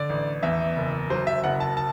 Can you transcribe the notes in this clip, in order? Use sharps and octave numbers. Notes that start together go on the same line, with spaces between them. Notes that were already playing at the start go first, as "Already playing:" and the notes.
Already playing: D3 D5
A1
E2 E5
F#1
F#3 C5
E5
F#1 F#5
A5
A5